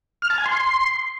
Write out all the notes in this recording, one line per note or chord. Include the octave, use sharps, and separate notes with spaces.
F6
A5
G#5
C6